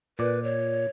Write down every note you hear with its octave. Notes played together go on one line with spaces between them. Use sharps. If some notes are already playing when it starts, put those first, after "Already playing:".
A#2 B4 D5
C#5